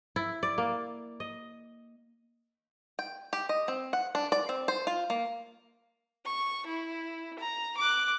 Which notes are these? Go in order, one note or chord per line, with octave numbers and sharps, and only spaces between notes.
E4
D5
A#3
D#5
G5
G4
D#5
C4
F#5
D4
D5
C4
C5
F4
A#3
C#6
E4
A#5
D6 F#6